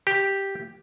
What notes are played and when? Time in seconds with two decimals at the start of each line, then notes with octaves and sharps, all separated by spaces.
0.07 G4